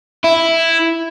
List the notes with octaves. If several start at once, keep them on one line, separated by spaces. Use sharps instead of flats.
E4